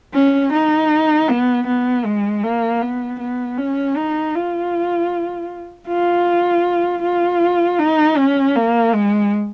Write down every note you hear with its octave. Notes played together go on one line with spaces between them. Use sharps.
C#4
D#4
B3
B3
G#3
A#3
B3
B3
C#4
D#4
F4
F4
F4
D#4
C#4
A#3
G#3